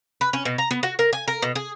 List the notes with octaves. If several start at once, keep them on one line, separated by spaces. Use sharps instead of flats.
B4
C#4
B2
A#5
B3
F#4
A#4
G#5
A#4
B2
G#4